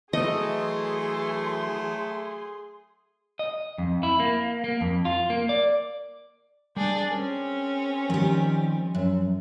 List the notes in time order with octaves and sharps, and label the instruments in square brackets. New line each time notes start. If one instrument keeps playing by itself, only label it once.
[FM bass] E3 [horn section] F#3 A3 [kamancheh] G#4 C6 [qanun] D#5
[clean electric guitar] D#5
F2
E4
A#3
A#3
F2
F4
A#3
D5
[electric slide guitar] G3 [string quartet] D4 G#4
[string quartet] C4 C#4 [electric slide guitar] G#4 A#4
[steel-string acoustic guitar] D#3 G4 [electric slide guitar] F3 G3
[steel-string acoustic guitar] F#2